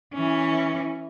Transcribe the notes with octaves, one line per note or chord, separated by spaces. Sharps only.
E3 C#4